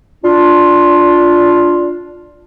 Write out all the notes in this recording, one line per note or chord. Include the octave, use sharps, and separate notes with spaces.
D4 F4